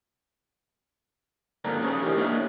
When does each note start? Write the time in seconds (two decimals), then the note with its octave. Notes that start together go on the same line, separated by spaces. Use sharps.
1.65 G2 D3 A#3 C4 D4 A#4
1.81 C#4 G#4 C5 C#5
2.02 B2 E3 D4 D#4 G4 A#4
2.17 A#3 D4 C#5 D#5 E5